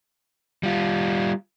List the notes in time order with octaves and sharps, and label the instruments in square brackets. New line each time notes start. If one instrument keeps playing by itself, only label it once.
[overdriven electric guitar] G3 F4